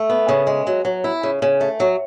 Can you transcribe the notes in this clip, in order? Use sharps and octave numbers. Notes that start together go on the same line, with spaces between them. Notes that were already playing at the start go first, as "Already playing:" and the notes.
Already playing: A3
B3
C#3
G#3
F#3
F#3
E4
C#3
C#3
A3
F#3